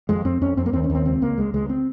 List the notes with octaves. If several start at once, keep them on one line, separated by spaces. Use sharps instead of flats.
F2 G#3
F2 C4
F2 C#4
F2 C4
A#3
D#2 C4
C#4
D#2
C4
C#2 C4
C#2 A#3
C#2 G#3
C#2 G#3
C4